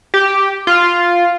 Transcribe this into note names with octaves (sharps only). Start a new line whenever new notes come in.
G4
F4